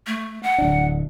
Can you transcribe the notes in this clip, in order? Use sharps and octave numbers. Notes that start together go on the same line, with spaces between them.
A3
F#5
D1 D4